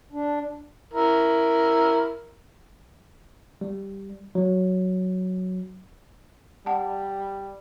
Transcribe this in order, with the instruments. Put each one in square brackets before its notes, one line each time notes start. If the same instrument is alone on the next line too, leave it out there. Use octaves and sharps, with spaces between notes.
[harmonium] D4
[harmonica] E4 A#4
[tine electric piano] G3
F#3
[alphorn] G3 [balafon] F#5 A5